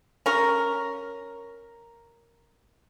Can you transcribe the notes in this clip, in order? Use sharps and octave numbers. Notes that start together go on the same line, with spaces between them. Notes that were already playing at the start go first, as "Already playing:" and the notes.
C#4 A#4